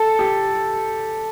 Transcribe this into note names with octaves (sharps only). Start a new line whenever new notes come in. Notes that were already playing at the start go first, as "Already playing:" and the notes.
Already playing: A4
G4